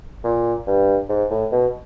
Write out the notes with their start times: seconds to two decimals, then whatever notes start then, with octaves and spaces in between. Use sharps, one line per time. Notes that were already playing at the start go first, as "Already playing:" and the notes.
0.24 A#2
0.67 G2
1.09 G#2
1.30 A2
1.52 B2